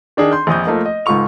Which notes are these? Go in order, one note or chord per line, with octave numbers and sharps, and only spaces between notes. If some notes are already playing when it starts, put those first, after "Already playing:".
D#3 D4 D#4 G#4
C6 G6
A#1 F2 D#6 G6
F3 A3 A#3 D#5
D#5
C#2 G#2 F4 A4 C#6 F7